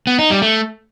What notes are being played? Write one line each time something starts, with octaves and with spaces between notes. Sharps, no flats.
B3
D#4
G3
A3